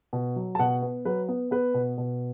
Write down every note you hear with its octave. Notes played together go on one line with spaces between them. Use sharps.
B2
F#3
A5
B2 F#5
B3
F#3 B4
B3
B3 B4
B2
B2